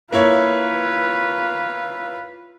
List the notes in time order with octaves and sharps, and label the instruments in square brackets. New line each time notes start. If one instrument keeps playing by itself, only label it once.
[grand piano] A#3 E4 C#5 [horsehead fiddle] F4 B4